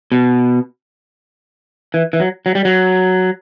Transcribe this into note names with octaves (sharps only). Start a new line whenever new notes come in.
B2
E3
E3
F#3
F#3
G3
F#3